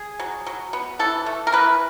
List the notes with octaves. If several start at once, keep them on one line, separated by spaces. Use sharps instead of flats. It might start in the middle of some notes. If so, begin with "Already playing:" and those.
Already playing: G#4
F#3
F#3
B3
E3 A4
A3
A#4
E3 B4